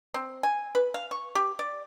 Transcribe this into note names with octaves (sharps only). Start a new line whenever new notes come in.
C4
G#5
B4
F5
C#6
G4
D5